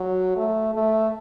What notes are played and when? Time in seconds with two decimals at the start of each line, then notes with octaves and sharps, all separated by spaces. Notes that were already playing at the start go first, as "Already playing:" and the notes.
Already playing: F#3
0.36 A3
0.75 A3